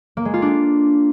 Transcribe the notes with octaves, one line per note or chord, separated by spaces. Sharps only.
A#3
G#3
F4
D4